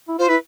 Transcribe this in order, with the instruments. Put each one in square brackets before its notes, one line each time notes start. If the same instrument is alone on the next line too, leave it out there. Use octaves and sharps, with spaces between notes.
[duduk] E4
[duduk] F4 [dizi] C5
[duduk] E4 [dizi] B4